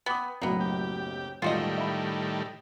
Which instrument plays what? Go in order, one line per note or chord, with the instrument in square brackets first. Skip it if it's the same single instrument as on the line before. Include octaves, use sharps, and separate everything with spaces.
[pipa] B3 [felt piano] G5 D6 D#6
[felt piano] F#1 B1 A2 [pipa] A#3 B3
[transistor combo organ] G4
[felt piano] E1 [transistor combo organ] A2 D#3 G3 [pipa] F4 F#4 D#5
[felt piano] E5 B5